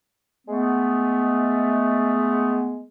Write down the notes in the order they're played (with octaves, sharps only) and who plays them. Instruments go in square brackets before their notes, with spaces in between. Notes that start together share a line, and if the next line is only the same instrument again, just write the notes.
[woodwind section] G#3 A3 B3